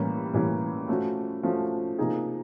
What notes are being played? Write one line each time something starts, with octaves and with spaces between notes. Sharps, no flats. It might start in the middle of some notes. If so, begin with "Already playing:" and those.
Already playing: A2 E3 G3 A#3 C#4
A2 E3 G3 A#3 C#4
F3 A3 C#4 F#4
F3 A3 C#4 F#4
C3 F3 A#3 D#4 G#4